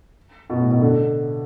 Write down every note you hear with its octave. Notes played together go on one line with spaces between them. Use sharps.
B2
A2
B2
D3